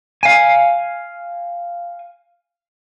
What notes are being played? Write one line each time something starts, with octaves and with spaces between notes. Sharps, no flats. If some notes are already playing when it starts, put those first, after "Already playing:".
F5 G#5